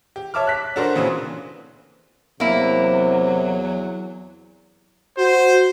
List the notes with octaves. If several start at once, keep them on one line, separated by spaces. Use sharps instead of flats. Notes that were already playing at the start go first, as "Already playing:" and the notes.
G4
C#5 E5 A5 D6 F6
F#6 B6
D4 F#4 A4 A#4 C5
A#2 C#3 E3 C4
E2 C3 F#3 A#3 E4
F#4 C5